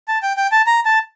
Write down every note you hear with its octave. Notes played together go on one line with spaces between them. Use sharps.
A5
G5
G5
A5
A#5
A5